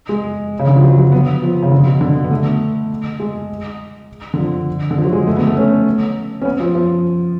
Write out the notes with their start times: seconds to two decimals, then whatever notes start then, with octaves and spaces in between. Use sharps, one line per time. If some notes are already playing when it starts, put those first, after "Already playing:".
0.09 G#3
0.59 C#3
0.67 D3
0.75 F3
0.83 F#3
0.98 F#3
1.12 B3
1.42 F3
1.62 C#3
1.72 D3
1.86 B2
2.01 D3
2.24 B3
2.31 A3
3.19 G#3
4.34 D3
4.38 F3
4.91 D3
4.98 F3
5.05 F#3
5.12 G#3
5.27 A3
5.36 B3
5.47 A3
5.57 C#4
6.42 C#4
6.45 B3
6.60 F3
6.75 F3